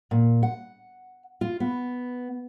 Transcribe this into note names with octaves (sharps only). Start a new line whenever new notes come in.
A#2
F#5
F4
B3